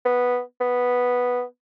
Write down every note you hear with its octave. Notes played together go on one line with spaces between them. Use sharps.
B3
B3